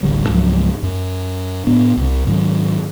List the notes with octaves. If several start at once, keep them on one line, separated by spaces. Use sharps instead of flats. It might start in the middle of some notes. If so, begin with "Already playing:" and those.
D1 A1 D3 G3
C#2 G#2 F3 F#3
F#2
A2 B3 D4
C2 C3
G#2 D#3 F#3